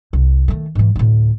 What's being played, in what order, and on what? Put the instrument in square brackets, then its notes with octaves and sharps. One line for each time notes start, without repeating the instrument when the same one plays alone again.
[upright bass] C2
D#3 A3
G#2 E3
D2 A2